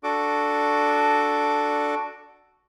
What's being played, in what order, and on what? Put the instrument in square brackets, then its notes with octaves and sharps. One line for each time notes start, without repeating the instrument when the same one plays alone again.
[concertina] D4 F#4 A4 D6